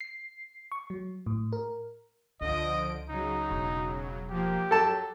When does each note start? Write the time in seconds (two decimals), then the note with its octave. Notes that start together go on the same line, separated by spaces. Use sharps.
0.01 C7
0.72 C#6
0.90 F#3
1.26 A2
1.53 A#4
2.41 C#2 D3 F3 D#5 D7
3.09 C#3 F#3 D#4
3.51 E1
4.30 F3 A#3 G4
4.71 F#3 A4 A5